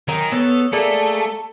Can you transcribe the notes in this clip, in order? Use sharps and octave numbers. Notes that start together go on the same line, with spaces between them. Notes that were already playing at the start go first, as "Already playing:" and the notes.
D#3 F#3 A#4 G#5
B3 A4 C#5
A3 A#3 G#4 A4 D5